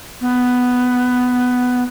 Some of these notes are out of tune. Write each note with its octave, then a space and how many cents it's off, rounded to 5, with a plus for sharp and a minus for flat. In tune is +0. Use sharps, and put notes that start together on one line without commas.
B3 +5